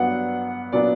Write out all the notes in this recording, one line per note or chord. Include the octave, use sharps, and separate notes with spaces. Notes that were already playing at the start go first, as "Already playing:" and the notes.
Already playing: G2 F#3 B3 D4 F#5
A#2 F#3 B3 D4 D5